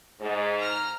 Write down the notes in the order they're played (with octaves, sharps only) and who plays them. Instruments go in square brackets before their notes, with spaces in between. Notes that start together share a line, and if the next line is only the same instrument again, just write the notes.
[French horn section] G#2
[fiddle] A#5 F6